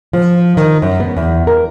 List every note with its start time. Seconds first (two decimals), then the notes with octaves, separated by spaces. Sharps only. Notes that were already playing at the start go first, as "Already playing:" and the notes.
0.13 F3
0.57 D#3
0.82 F#2
1.00 B3
1.17 E2
1.47 A#4